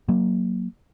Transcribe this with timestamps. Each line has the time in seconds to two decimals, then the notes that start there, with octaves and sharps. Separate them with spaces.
0.08 F#3 A#3